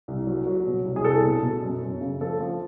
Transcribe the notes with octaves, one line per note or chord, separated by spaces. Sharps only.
C2
F#3
F#3
B2
C2
G#4
C2 A4
B2
B2
F#2
F#2
C#3
F3 A4
F3